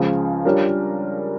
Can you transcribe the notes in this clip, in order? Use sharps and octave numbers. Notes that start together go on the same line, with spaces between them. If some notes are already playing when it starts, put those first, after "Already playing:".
Already playing: C#2 C#3 F3
G3 D4 F4 A#4 C#5